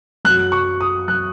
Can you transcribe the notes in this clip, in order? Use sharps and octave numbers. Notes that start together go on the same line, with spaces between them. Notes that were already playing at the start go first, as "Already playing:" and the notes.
F#2 F#3 F#6
C#6
D#6
F#3 F#6